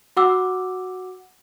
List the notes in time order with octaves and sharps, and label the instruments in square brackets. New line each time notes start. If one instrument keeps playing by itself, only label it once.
[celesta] F#4 F#5 D6 E6